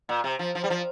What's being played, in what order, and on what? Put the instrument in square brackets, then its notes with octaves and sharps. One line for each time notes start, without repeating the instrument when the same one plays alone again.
[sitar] A#2
C3
F3
F3
G3
F3